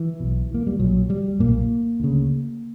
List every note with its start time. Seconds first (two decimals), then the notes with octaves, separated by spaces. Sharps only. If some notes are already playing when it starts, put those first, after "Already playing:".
Already playing: E3
0.20 B1 B2
0.54 A#3
0.67 G3
0.79 B1 A#2 F#3
1.10 G3
1.39 B1 A#2 A#3
2.00 D2 C#3